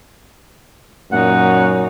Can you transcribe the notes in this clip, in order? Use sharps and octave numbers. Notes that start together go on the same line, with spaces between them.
F#2 A#2 D#4 C#5 F#5